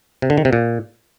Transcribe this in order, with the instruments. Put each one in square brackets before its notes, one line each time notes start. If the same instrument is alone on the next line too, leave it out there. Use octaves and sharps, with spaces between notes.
[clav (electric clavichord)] C3
D3
D#3
C3
A#2